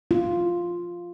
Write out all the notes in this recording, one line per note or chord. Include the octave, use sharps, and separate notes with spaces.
F4